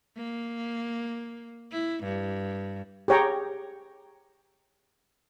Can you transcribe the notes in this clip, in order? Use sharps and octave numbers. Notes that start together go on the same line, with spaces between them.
A#3
E4
G2
G4 G#4 C#5 G5 A#5